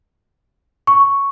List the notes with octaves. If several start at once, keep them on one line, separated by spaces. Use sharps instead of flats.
C#6